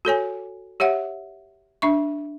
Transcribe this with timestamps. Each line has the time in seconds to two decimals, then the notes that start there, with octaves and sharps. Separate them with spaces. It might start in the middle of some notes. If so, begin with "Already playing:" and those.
0.05 F#4 A4 C#5 G#5
0.80 G4 C#5 E5 F#5
1.82 D4 E5 C#6